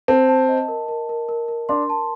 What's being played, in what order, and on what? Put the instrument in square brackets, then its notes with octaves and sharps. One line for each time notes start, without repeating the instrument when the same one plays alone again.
[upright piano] C4 [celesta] A5
[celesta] A5
D#5
A#4
A#4
A#4
A#4
A#4
[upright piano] D4 [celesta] C6
[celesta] A5